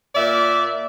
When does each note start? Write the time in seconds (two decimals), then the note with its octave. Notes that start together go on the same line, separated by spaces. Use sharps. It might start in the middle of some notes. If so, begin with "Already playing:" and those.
0.15 A#2 D5 E5